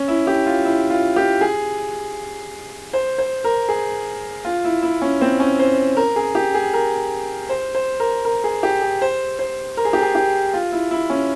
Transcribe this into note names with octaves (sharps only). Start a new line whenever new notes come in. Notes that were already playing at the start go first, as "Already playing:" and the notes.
Already playing: C#4
E4
G4
F4
E4
F4
G4
G#4
C5
C5
A#4
G#4
F4
E4
E4
C#4
C4
C#4
C5
A#4
G#4
G4
G#4
A#4
C5
C5
A#4
A#4
G#4
G4
G#4
C5
C5
A#4
G#4
G4
G#4
G4
F4
E4
E4
C#4